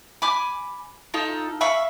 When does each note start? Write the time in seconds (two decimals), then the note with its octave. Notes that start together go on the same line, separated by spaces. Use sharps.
0.22 G#5 B5 D6
1.14 D#4 F4 A4
1.61 E5 F5 B5 C#6